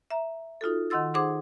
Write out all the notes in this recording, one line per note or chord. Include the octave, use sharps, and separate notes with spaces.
E5 A#5
D#4 F4 F#4 A4
D#3 D#5 F#5 C6 E6 A6
D#4 G#4 C5 F#5 C6 D6